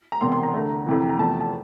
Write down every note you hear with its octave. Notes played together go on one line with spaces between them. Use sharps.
A#5
E1 E2 C3 C6
C6
A#5
D2 D3 A3
F2 C3 E3
A#5
E2 C3 F3 A3 A5
A5